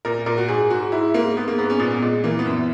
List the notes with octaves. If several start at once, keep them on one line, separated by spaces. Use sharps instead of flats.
A#2 A#4
A#2 A#4
F#4
G#2 G#4
G#2 F#4
G#2 E4
G#2 A#3
G#2 B3
A#3
G#2 B3
C#4
A#2 B3
A#2 G#3
E3 A#3
B3
F#2